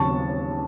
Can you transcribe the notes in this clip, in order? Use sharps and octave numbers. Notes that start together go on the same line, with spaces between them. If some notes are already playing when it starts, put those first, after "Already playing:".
Already playing: D#2 C#3 F#3 C4 A5 C#6